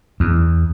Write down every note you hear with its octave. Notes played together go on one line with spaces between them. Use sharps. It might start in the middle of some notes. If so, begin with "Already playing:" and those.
E2